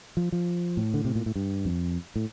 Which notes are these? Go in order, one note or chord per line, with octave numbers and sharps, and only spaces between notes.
F3
F3
A2
D3
C3
A#2
A2
G2
F2
A2